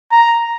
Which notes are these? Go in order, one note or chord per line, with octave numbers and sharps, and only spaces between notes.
A#5